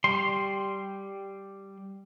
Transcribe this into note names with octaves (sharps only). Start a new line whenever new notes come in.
G3 C6